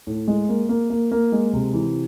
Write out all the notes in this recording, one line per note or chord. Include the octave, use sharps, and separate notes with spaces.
A2
G#3
A#3
A#3
A#3
A#3
G#3
C3
E3